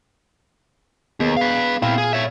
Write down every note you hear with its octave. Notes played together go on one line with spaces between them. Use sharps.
D#2 B3 G#4
B4 F5
A#2 C4 E4 F5
G#4
C#5 E5